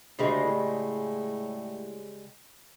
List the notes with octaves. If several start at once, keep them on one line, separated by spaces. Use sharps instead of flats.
D2 C#3 G3 G#3
A2